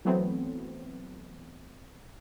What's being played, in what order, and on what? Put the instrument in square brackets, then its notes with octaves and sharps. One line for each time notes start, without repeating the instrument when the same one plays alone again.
[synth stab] E3 F#3 A3 B3 C4